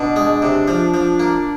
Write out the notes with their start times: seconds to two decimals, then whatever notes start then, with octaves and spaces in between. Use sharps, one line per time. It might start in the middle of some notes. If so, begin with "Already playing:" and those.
Already playing: B2 D4
0.16 G#3
0.42 C3
0.68 F3
0.94 F3
1.20 A#3